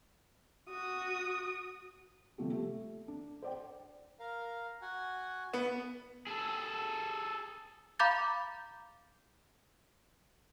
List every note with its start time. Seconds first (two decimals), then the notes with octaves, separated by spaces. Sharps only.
0.69 F#4 D#6
2.38 C3 G3 A3 F4 G4
2.52 A3
3.08 D4
3.43 C5 D5 G5
4.20 A#4 F5
4.82 F#4 F#5 G#5
5.53 B3
6.27 G#4 A4
7.99 F5 A#5 B5 D6 G6 A6